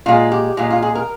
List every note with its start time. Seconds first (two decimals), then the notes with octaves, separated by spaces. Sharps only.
0.06 A#2 G#3 F4
0.32 G4
0.57 A#2 G#3 F4
0.70 F4
0.82 G#4
0.95 A#4